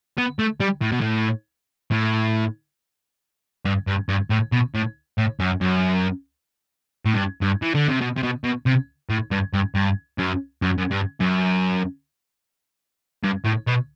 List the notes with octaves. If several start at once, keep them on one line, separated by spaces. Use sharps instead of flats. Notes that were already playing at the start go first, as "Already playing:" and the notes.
B3
A3
G3
A2
B2
A2
A2
G2
G2
G2
A2
B2
A2
A2
F#2
F#2
A2
G2
G2
E3
D3
C3
B2
C3
B2
B2
C3
A2
G2
G2
G2
F#2
F#2
F#2
G2
F#2
G2
A2
B2